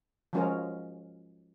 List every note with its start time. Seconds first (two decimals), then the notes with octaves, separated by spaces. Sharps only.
0.33 F3 F#3 G#3 C#4 F4 A#4